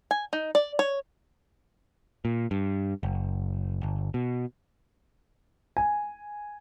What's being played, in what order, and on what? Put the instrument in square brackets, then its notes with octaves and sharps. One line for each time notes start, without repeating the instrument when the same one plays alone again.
[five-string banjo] G#5
D#4
D5
C#5
[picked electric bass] A#2
G2
F#1
G1
B2
[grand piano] G#5